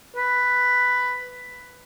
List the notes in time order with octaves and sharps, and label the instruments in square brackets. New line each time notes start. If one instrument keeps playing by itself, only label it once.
[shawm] B4